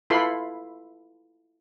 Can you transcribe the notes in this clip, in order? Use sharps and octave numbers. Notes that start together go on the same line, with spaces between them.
E4 F4 A4 B4 B5 C6